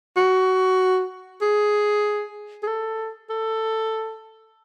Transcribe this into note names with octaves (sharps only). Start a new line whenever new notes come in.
F#4
G#4
G#4
A4
A4